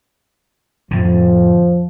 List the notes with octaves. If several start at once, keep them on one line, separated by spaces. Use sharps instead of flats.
F2 A2 D3 F3